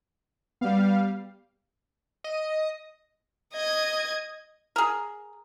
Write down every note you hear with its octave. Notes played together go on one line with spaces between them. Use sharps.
G3 B3 F5
D#5
D#5 G#6
G#4 A#4